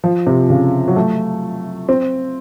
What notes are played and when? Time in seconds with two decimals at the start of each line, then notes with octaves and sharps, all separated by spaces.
0.04 F3
0.27 C3
0.50 C#3
0.88 F#3
0.96 A3
1.89 C4